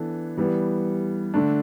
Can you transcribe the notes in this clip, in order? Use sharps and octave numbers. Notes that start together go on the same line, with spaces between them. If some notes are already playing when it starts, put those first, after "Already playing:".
Already playing: E3 B3 D4 A4
E3 G3 B3
D3 A3 D4